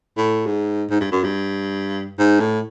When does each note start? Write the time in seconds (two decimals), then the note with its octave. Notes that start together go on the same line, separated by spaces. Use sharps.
0.17 A2
0.46 G#2
0.90 G#2
1.00 G2
1.11 F#2
1.24 G2
2.19 G#2
2.40 A2